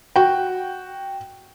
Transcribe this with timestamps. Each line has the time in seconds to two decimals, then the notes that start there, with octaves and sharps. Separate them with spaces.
0.16 F#4 G5